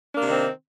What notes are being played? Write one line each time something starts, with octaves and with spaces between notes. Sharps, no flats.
C3 D#3 A#3 C4 D4